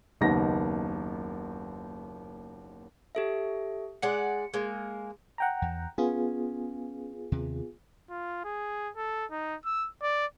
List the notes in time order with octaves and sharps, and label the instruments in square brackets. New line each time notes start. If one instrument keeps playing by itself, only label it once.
[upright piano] F#1 D#2 B3 D#4 A#6
[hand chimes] G4 A4 E5
[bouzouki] G#3 D5 F#5 [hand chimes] C#7
[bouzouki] G#3 A#3
[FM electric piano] F#5 G5 A#5
[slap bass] E2
[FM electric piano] B3 F4 G#4 [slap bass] C#4
[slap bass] D#2 C3
[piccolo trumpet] F4
G#4
A4
D#4
E6
D5